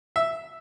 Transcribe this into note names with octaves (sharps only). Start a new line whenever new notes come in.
E5